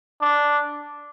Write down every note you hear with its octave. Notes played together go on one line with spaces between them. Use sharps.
D4